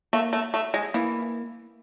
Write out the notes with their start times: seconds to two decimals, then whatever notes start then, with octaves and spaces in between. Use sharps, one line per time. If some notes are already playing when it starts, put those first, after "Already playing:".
0.13 A3 A#3
0.33 A3
0.54 A3
0.74 G#3
0.94 E3 A#3